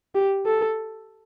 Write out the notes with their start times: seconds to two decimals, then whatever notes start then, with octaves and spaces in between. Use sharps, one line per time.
0.15 G4
0.46 A4